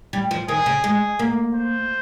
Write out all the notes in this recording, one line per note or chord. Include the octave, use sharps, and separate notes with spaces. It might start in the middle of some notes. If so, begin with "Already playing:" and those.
G3
F3
D#3 G#4
C#3
G#3 G#4
A#3
C5